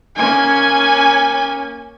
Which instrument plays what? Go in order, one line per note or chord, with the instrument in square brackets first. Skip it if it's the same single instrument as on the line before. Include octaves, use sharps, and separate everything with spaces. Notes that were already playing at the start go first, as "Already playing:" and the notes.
[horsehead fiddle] A#3 C#4 [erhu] G#5